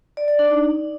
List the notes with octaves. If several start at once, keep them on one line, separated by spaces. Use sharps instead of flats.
D5
D5
D4
D#4